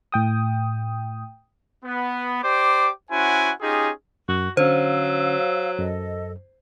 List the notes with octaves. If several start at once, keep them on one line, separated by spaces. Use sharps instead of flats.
A2 G5 D#6
B3
G4 C5 D5 D6
C#4 E4 F#4 C5 F#5 G#5
C#4 D#4 F4 G4 G#4
F#2 F#4
D3 F#3 C#4 C5 F5 E6
F#2 A4 D#5